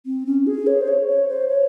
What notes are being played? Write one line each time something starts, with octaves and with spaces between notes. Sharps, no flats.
C4
C#4
G#4
C#5
C5
C#5
C#5
C5
C#5